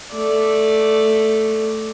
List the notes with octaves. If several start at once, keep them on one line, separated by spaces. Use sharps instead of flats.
A3 D5